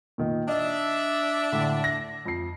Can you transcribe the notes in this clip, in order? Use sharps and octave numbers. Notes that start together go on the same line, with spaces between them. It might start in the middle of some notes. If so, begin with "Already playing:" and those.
A#2 D#3
D4 D#5 E5
A2 D3
A#6
F2 C7